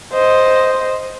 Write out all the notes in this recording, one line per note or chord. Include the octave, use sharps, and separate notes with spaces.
C5 D#5